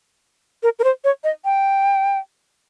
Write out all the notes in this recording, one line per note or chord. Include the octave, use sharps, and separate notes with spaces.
A#4
A#4
C5
C#5
D#5
G5